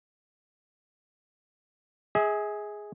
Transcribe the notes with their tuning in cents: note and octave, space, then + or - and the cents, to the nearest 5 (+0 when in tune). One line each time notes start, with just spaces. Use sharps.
G#4 +0 E5 -45